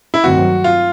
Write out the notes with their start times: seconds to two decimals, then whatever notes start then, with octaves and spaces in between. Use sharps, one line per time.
0.14 E4
0.23 G2 D#3 F#3 A3 C4 F#4
0.64 F4